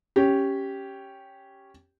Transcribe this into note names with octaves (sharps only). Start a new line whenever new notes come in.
C#4 G4